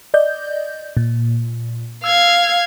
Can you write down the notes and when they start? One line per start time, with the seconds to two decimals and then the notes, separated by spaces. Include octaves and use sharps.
0.14 D5 D#5 G6
0.97 A#2
2.04 F5 E6 G#6